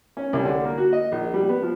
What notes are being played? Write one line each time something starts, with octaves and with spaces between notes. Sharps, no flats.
C#4
C2
D3
A#3
F#4
D#5
A#1
G3
B3
F3